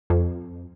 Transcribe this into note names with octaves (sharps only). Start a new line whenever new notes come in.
F2